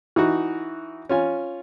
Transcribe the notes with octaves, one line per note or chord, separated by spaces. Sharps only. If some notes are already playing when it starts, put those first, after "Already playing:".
E3 D#4 F#4
C#4 F4 G#5